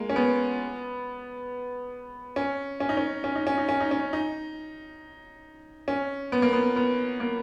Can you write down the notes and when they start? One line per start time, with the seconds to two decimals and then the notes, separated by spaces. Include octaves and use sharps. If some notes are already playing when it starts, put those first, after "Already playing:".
Already playing: G#3 A#3
0.10 C#4
0.16 B3
2.36 C#4
2.80 C#4
2.89 D#4
2.97 C#4
3.24 C#4
3.35 D#4
3.47 C#4
3.58 D#4
3.69 C#4
3.80 D#4
3.91 C#4
4.13 D#4
5.88 C#4
6.32 B3
6.42 A#3
6.53 B3
6.76 B3
7.20 A#3